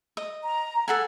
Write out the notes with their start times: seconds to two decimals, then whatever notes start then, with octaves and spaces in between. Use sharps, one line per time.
0.17 D#5
0.43 A#5
0.88 A4 F#5 G#5